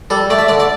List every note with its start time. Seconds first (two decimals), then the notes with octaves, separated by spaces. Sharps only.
0.10 G3 A4
0.30 A3 D5
0.39 E5
0.49 D3 D5
0.60 D5